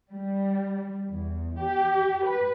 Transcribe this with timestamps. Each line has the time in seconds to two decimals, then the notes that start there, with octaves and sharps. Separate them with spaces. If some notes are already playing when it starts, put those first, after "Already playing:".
0.11 G3
1.09 E2
1.58 G4
2.24 B4